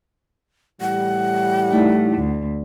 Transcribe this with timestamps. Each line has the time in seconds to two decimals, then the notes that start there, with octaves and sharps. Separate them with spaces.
0.81 A2 E3 G3 F#5
1.71 A3 D#4 E4 D5
2.18 D2